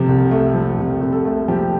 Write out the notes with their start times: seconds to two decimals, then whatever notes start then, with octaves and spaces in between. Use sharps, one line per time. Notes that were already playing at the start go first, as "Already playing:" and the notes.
Already playing: C3 F3 A3
0.09 C2
0.31 A3
0.54 F3
0.78 C3
1.01 C2
1.13 A4
1.25 A3
1.48 F3 G4